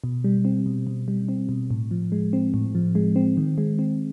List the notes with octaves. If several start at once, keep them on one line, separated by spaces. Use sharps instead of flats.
B2
G3
C4
B2
B2
G3
C4
B2
A2
F3
G#3
C4
A2
F3
G#3
C4
D#3
G#3
C4